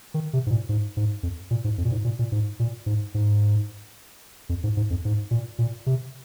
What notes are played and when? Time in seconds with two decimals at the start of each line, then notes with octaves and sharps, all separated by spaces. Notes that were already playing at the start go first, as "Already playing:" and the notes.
0.14 D#3
0.33 C3
0.46 G#2
0.51 A#2
0.69 G#2
0.97 G#2
1.23 F2
1.51 A#2
1.64 G#2
1.78 F2
1.85 A#2
1.92 G#2
2.05 A#2
2.19 A#2
2.32 G#2
2.59 A#2
2.86 G#2
3.14 G#2
4.49 F2
4.63 G#2
4.77 G#2
4.90 F2
5.05 G#2
5.31 A#2
5.59 A#2
5.86 C3